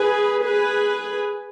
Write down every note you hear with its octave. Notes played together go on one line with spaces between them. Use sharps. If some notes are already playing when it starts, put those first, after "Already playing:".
Already playing: G#4 B4
G#4 B4